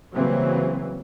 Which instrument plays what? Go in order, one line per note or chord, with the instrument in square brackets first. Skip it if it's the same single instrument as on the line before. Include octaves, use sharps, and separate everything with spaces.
[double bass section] C#3 E3 F#3 G3 A#3 C4